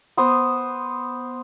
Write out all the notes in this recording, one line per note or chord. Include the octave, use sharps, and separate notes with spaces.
B3 C5 D#6